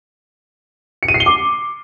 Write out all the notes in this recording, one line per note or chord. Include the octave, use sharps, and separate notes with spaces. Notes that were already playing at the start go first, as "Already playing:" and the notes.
C#7
D#7
C7
G7
D6